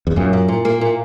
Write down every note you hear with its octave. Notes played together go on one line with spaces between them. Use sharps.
E2
F#2 A#2
A#2
A#2
A#3
A#2